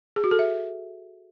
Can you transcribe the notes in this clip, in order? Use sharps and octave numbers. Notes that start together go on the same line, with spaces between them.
G#4
F#4
A4
E5